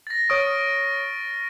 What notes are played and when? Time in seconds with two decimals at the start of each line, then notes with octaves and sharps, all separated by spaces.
0.07 A6 A#6
0.30 C#5 C#6 D#6 F6 D7